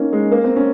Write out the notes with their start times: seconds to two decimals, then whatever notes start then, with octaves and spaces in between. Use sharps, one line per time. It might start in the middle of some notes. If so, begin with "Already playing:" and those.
Already playing: A#3 C#4 D#4
0.13 G#3
0.32 A#3
0.44 C4
0.56 C#4